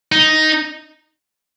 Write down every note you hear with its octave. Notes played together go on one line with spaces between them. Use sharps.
D#4